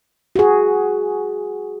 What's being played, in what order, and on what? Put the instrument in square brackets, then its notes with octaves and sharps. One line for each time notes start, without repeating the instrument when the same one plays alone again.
[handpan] F#4 G#4